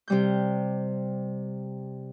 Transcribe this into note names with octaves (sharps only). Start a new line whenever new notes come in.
C3 G3 G6